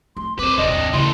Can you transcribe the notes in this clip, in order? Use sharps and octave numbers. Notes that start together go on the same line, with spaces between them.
A3 C6
C4 B4 C5 D6
D#1 C3 D4 D#5
D#2 A2
C#3 E3 A3 C6